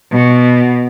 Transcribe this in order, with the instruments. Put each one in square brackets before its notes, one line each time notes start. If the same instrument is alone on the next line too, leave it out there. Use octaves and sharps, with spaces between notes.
[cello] B2